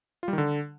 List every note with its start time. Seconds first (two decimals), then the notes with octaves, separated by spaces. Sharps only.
0.23 F4
0.28 G3
0.33 D#3
0.38 D3